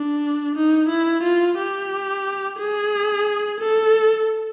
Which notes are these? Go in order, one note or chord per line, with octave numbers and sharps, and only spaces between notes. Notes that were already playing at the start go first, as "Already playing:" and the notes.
Already playing: D4
D#4
E4
F4
G4
G#4
A4